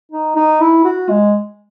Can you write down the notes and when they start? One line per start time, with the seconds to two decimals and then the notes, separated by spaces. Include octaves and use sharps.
0.12 D#4
0.36 D#4
0.61 E4
0.84 F#4
1.09 G#3